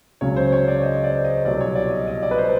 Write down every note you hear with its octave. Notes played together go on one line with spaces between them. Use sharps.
C#2 C#3 F#3 C#5
C5
C#5
D5
D#5
D5
D#5
C2 B2 F#3 D5
C#5
D5
D#5
D#5
D5
B4
C5